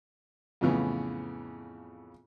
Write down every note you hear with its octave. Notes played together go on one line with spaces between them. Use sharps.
F2 A2 C#3 E3 B3